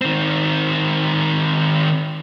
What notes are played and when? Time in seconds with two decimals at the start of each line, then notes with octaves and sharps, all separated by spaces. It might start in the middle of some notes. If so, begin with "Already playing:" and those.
0.01 D#3 C4